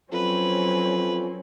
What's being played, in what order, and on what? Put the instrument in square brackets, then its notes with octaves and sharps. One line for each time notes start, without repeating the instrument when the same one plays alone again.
[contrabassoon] F2 [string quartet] F#3 C4 C#4 [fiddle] B4